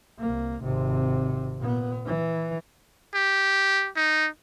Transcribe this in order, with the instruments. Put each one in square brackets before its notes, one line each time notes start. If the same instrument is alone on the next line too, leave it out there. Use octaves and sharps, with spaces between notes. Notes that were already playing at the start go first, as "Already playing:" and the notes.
[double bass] C2 A#3
G#1 C3
A#2 B3
E3
[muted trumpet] G4
D#4